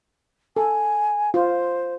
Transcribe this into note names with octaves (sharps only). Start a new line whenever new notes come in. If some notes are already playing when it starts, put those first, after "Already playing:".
A4 G#5
F4 C5